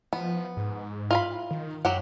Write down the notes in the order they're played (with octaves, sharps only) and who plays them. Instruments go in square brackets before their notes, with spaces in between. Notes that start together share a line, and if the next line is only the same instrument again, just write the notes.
[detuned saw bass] F3 [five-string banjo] B3
[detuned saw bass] G#2
[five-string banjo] F4 F5 B5
[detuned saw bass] D#3
[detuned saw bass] F#2 [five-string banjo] F#3 G4 F#5